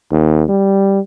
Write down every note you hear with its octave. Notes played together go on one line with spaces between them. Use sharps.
D#2
G3